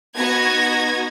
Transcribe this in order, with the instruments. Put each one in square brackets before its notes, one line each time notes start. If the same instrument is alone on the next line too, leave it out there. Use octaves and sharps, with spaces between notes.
[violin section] B3 D#4 F#4 G#6 A#6